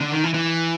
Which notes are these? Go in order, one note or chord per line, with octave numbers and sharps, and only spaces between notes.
D3
D#3
E3
E3